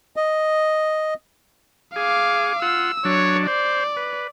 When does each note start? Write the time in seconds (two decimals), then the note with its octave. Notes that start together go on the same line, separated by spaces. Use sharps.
0.16 D#5
1.96 G#4 F5 D6
2.62 F4 F#5 E6
3.05 F#3 D4 C#5
3.47 C5 D5
3.96 B4